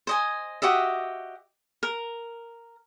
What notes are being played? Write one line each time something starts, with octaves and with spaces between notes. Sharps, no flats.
C5 D#5 G#5
F#4 G4 D#5 E5
A#4